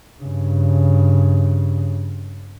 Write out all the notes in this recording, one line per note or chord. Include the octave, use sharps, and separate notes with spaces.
G2 C#3